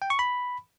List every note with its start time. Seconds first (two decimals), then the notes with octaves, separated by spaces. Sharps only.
0.02 G5
0.10 C#6
0.19 B5